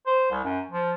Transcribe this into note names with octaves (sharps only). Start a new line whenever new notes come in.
C5
C2
F#2
F3